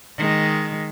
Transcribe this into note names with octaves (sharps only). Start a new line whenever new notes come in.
D#3 G#3